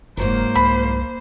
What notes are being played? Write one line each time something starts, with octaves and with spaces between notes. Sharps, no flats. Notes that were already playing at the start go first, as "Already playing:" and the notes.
F#1 G#2 F#3 A#3 A#4 C5
C2 B5